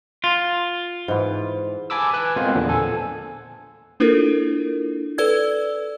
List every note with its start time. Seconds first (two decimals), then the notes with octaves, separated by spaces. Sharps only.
0.24 F4
1.08 G#2 E3
1.90 G#5 A5 B5 D6 E6
2.13 B4 G#5 F#6
2.36 G#3 B3 C4 F4 A#4 C5
2.55 E2 A#2 D3 F3
2.69 A4 G#5
4.00 A#3 D4 E4 F4 A4 A#4
5.18 A4 B4 D5 E6 G#6